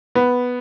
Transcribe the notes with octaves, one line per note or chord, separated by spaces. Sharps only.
B3